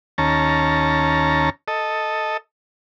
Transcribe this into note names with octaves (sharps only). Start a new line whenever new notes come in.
D#2 C#4 A5 A#5
A4 D#5